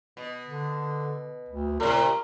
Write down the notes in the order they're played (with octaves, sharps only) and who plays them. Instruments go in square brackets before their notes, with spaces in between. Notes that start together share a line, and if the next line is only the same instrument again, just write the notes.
[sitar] B2
[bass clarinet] D3
D2
[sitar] A2 C3 [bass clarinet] A#4